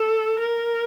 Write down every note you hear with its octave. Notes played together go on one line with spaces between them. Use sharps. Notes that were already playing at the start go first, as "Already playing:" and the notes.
Already playing: A4
A#4